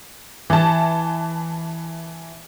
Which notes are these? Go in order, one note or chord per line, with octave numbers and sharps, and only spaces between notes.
E3 A5